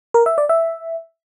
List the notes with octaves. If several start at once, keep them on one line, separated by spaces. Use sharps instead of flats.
A#4
E5
D5
E5